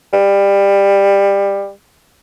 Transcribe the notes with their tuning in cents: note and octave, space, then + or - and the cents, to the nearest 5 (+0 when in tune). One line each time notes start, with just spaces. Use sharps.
G3 +20